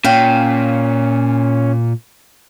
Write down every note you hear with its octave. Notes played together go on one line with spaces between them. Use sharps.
A#2 C#4 F5 G5